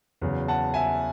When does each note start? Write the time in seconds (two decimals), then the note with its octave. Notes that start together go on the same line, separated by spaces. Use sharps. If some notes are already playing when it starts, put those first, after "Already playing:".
0.21 E2 C#3 F#3
0.48 F#5 A5
0.74 E5 G#5